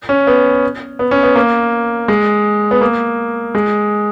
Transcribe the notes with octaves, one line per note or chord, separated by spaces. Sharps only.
C#4
B3
B3
C#4
B3
A#3
G#3
B3
A#3
G#3